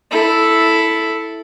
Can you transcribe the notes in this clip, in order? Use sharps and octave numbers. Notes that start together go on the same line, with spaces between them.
E4 A4